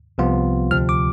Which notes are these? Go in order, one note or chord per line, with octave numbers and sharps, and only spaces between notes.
C2 C3 F3 B3 F4
D2 C3 F3 C4 F6
D6